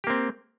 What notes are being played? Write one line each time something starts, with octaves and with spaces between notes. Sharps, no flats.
A#3 C4 G4